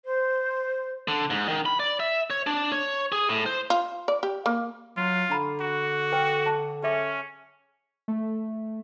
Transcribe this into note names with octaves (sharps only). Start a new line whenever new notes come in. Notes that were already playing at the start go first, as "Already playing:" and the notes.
C5
D3
G#2
D#3
B5
D5
E5
C#5
D4
C#5
G#4
A2
C5
F4
D5
G4
A#3
F#3 F4
D3 D4 A#5 B5
F#4
A4 B4 G5
A5
C#4 G#4 E5 D6
A3